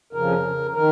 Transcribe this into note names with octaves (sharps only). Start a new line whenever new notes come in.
F2 C#3 F3 A#4
D#3 A#4